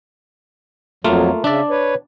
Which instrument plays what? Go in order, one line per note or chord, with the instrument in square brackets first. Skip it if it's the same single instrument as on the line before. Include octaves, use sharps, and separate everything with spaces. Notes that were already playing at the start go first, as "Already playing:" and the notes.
[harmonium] F2 F#3 [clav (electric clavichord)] A3 A#3 F4
[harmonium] C#3 E5 [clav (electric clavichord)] D4 D5
[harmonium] B4 C#5